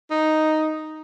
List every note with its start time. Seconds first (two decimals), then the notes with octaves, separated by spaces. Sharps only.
0.11 D#4